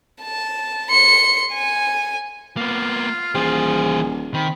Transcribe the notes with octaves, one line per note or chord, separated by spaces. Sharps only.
A5
C6 C#7
G#5
A#3 B3 F4
D#1 E3 G#4 C5
D#3 C4 B5